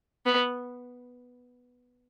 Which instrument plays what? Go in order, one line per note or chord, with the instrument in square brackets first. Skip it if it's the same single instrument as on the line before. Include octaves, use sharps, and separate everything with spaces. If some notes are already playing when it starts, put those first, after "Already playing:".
[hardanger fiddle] B3